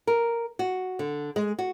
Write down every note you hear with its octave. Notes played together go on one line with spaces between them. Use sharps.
A#4
F#4
D3
G#3
F#4